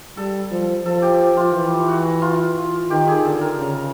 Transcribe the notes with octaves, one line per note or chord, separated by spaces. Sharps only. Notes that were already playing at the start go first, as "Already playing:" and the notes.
G3 A4
F3
F3 A4
G4
F4
E3
F#4
F4
D#3 G4
G#4
D3 A4
A#4
C#3